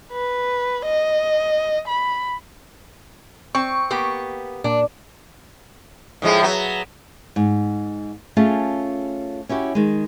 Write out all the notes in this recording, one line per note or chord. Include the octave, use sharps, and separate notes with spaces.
B4
D#5
B5
C4 C#6
A#3 B3 G4
A#2 D4
A2 F3 G#3
F#3 B3
G#2
A3 C#4 F4 G#4 A5
C#4 E4 F#4 G4
D#3 G#3